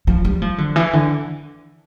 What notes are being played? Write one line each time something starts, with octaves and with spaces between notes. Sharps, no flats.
F3
G3
F3
D3
E3
D3